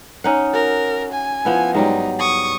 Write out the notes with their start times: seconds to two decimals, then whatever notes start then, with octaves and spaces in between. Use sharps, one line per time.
0.24 C#4 D#4 F#5
0.53 F#4 A#4
1.13 G#5
1.45 F3 B3 E4
1.75 G#2 F#3 G3 D#4
2.20 C#6 D#6